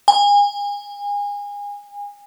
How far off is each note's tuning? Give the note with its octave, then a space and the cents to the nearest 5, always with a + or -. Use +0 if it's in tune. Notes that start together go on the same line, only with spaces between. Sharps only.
G#5 -30